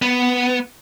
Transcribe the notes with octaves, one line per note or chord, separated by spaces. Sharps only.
B3